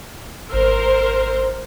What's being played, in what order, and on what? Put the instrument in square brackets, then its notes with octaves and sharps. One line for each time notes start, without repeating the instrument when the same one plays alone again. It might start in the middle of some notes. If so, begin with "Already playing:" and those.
[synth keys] G#1 E6 [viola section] A#4 C5